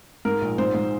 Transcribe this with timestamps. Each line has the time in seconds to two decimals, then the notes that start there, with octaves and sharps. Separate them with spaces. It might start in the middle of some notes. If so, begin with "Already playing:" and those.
0.25 G#2 A#4
0.41 A#1
0.58 G#2 C5
0.74 G#2